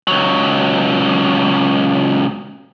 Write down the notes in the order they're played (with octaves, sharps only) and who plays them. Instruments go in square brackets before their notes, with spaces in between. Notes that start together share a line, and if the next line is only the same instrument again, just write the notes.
[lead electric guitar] C#2 F#3